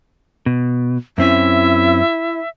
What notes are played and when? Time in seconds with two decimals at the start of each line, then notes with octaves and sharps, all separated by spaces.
0.46 B2
1.18 F#2 C4 C#4 E4 E5